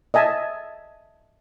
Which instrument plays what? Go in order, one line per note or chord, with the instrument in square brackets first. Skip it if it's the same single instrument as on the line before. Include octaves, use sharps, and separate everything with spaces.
[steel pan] D#5 E5 G#5 A5